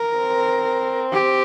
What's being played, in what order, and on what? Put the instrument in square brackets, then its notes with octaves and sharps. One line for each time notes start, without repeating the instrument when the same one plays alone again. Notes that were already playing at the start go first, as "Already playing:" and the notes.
Already playing: [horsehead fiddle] A#4
[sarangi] C4
[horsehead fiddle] G4